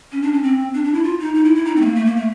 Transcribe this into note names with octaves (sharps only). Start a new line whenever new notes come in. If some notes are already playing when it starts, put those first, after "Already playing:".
C#4
D4
C#4
C4
D4
D4
E4
F4
D#4
D#4
E4
E4
D#4
C4
A3
A#3
A3
A#3
A3